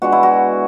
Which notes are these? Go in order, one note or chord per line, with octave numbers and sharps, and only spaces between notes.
B2 G#3 D4 F#4
E4
F#4